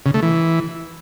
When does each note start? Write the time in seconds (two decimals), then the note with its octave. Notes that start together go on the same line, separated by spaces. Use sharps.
0.06 C#3
0.14 A3
0.23 E3